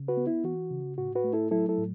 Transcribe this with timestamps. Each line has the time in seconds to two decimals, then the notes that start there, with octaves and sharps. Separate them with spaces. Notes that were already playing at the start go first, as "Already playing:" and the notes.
Already playing: C#3
0.08 F#4 B4
0.17 B3
0.27 E4
0.44 E3 F#4
0.71 C#3
0.98 A2 F#4
1.15 F#4 B4
1.24 A3
1.33 E4 A4
1.51 F#3 E4 A4
1.69 E4 A4
1.78 A2